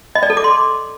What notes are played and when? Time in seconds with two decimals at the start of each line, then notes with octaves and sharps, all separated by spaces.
0.15 D#5
0.23 D5
0.30 A4
0.37 D6
0.44 C6